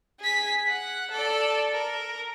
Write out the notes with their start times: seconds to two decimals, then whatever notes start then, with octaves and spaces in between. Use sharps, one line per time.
0.20 G#4 B6
0.67 F#5
1.11 A4 D5
1.73 A#4